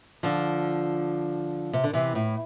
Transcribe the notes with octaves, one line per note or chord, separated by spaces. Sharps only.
D3 F3
C3
D3
C3 E3
A2